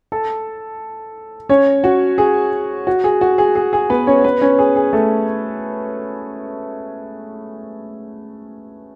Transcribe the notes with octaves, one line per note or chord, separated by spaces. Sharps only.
A4 A5
C#4 C#5
F#4
G#4
F#4
G#4
F#4
G#4
G#4
G#4
B3 B4
C#4 C#5
B3 B4
C#4 C#5
G#4
G#4
A3 A4